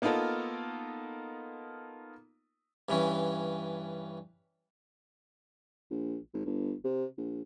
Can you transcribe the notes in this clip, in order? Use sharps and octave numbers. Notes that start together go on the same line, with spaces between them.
A#3 B3 D#4 F4 A4 A#4
G2 E3 C#4
A#1
G#1
G1
C3
A#1